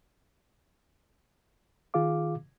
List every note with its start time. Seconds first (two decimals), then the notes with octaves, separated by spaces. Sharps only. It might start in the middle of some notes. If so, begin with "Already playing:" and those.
1.94 D#3 F4 G#4 F5 D6